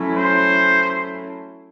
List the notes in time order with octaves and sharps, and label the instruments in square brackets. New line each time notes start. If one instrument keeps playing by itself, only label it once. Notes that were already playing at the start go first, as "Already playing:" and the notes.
Already playing: [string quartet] F#3 A3 C#4 E4
[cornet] C5